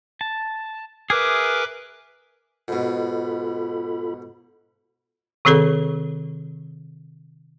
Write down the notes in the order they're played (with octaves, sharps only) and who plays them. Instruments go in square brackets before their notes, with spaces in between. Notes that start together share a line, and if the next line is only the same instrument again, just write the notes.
[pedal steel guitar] A5
[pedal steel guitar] G#4 E5 [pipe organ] A#4 B4 D6
[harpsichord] G#2 B2 [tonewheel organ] F4 A4 B5
[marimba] C3 D#3 C4 G#4 A4